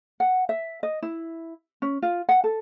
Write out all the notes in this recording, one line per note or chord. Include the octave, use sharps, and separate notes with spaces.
F#5
E5
D#5
E4
C#4
F4
F#5
A4